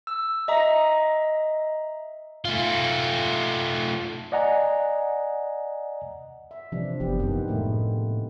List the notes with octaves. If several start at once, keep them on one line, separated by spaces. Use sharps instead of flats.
E6
D#5 E5 A#5
A3 F4
D5 D#5 F#5 G#5 A#5
E5
C3 E3 F3 D4
F#1 B3 G4
F#2 D#3 A#3 C4
A2 G#3 A3 E4